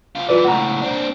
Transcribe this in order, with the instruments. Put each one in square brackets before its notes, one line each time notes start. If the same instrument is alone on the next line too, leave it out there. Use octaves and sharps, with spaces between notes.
[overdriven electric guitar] F#2 F4
[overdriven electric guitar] F#2 E3 [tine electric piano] F4 B4 D5
[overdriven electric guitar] C#2 A2 [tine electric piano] F#5 A#5
[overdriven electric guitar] C4 D4